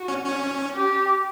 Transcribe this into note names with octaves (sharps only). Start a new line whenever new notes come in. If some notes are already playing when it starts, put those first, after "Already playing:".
Already playing: F#4
C#4
C#4
G4